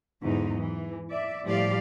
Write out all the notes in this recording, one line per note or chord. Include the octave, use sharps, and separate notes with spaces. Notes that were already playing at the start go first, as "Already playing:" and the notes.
E2 G#2 D3 F#3 D#4
E3
D5 E5
A2 F3 G3 G4 D5 F5